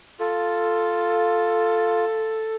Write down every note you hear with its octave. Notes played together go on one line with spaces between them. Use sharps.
F4 A4